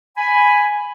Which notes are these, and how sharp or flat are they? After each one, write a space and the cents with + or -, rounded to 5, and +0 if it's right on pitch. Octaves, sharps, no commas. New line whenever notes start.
G#5 +0 B5 +5